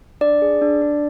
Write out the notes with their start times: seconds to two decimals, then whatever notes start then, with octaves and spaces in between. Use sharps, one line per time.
0.21 D4 D5
0.42 G#4
0.62 D4
0.82 D4